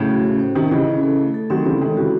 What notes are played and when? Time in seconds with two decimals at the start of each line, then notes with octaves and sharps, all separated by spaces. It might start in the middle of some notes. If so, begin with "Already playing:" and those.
Already playing: A2 C#3 F#3
0.09 F#4
0.24 C#4
0.40 C5
0.55 C3 D#3 C#4
0.71 C#3 E3 D#5
0.87 C#4
1.03 A4
1.19 A3
1.34 A4
1.50 D#3 F#3 C4
1.65 C#3 E3 C#5
1.81 C3 D#3 G#3
1.97 C#3 E3 F#4